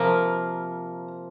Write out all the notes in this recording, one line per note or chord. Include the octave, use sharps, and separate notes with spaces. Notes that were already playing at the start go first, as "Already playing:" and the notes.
Already playing: C3 F3 A#3 A#4